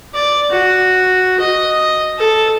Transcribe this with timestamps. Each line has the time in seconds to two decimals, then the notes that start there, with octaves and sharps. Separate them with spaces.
0.14 D5
0.50 F#4
1.40 D#5
2.18 A4